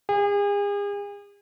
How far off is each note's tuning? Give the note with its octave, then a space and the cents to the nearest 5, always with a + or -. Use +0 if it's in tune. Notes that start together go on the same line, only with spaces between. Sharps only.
G#4 -40